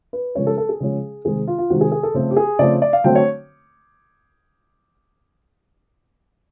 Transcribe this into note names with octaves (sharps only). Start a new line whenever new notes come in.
B4
C#3 F3 G#3 C#4 C#5
A4
A4
G#4
C#3 F3 G#3 C#4
C3 D#3 G#3 G#4
F4
F4
C3 D#3 G#3 F#4
G#4
G#4
A4
C#3 F3 A3 C4
G4
G#4
C#3 F3 A3 C4 D5
D5
F5
D3 F#3 A3 C4 G5
C#5